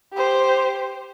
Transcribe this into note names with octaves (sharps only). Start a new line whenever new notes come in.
G4 C5